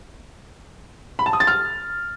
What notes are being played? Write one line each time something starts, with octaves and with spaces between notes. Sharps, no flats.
B5
A5
D#6
A6
F6